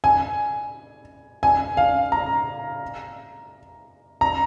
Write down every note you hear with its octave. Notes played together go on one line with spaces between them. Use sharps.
G#5
G#5
F5
A#5
A#5